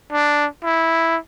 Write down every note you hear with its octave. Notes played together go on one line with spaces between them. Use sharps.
D4
E4